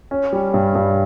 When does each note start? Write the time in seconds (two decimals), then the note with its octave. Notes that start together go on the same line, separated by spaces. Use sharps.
0.11 C#4
0.33 G3
0.54 G2
0.75 G2